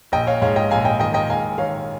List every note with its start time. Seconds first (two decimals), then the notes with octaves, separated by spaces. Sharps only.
0.12 A#1 D#5 G5
0.27 C#5 F5
0.42 G#2 C#5 F5
0.56 D#5 G5
0.71 A#1 F5 G#5
0.85 D#5 G5
1.00 D#3 D#5 G5
1.14 D#5 G5
1.29 G#2 F5 G#5
1.58 D#3 C#5 F5